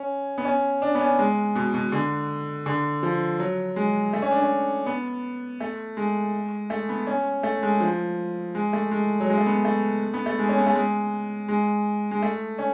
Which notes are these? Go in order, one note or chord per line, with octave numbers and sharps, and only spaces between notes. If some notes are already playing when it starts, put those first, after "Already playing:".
Already playing: C#4
B3
C#4
D4
B3
C#4
G#3
B2
B2
D3
D3
F3
F#3
G#3
A3
C#4
D4
C#4
B3
A3
G#3
A3
B3
C#4
A3
G#3
F3
G#3
A3
G#3
F#3
G#3
A3
B3
A3
B3
A3
G#3
C#4
B3
A3
G#3
G#3
G#3
A3
C#4